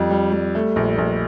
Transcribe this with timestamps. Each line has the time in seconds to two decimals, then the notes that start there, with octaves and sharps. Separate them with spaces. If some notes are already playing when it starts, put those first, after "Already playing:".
Already playing: F2 G3
0.10 G3
0.32 G3
0.55 A3
0.76 A#1
0.98 A#1